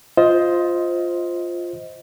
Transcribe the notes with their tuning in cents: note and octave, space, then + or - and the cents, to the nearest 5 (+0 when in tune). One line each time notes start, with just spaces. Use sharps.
F4 +0 C5 +0 D#5 +20